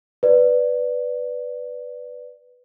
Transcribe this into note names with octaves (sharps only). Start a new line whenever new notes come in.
B4 D5